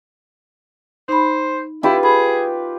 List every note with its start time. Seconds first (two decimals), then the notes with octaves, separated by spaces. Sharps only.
1.09 D#4 C5 B5
1.83 E4 F4 G4 B4
2.03 G#4 B5